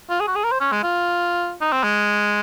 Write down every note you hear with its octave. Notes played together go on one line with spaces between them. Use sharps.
F4
G#4
F#4
G#4
A#4
C5
C#4
G#3
F4
D#4
C4
G#3